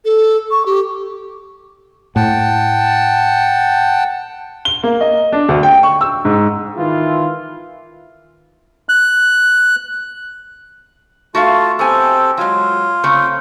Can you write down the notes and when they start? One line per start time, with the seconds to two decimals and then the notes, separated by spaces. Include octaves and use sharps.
0.05 A4
0.51 C#6
0.66 G4
2.16 A2 F#5 G5 A5
4.65 G7
4.83 A#3
5.01 D#5
5.32 D4
5.49 D2
5.63 G5
5.83 C#6
6.01 E6
6.25 G#2
6.77 D#3 E3 E4 F4
8.89 F#6
11.35 A3 F4 F#4 E5 F5 A5
11.79 B3 C4 G4 A4 G#5
12.37 F#3 G#3 F4
13.03 C#3 A3 C4